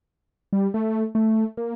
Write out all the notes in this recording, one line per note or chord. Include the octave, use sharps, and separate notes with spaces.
G3
A3
A3
A#3